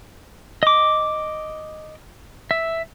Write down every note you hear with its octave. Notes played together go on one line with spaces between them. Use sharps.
D#5 D6
E5